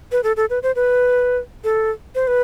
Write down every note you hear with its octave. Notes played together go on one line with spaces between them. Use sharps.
B4
A4
A4
B4
C5
B4
A4
C5
B4